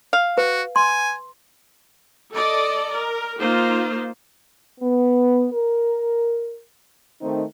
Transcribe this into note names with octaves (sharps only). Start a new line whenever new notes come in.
F5
F#4 B4
G#5 C6
A4 D5 D#5
A#4
A#3 D#4 F4 C5
B3
A#4
D#3 A3 C4 D#4